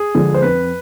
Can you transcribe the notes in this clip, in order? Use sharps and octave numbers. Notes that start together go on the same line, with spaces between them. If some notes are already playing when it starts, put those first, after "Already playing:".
Already playing: G#4
D3 F3 G#3
C5
F2 B4